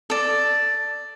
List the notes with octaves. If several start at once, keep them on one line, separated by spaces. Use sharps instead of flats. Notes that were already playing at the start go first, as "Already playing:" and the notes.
A4 D5